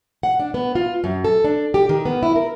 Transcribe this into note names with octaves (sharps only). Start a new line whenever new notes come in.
F#5
D4
B3
F4
F#2
A4
D4
G4
D#3
B3
E4
A#4